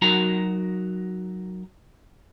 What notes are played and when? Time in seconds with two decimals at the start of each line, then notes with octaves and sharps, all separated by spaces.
0.02 F#3 D#4 F#4 A#4 A#5